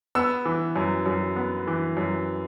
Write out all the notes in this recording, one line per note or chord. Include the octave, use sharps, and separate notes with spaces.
B3 E6
E3
F#2
F#2
B3
E3
F#2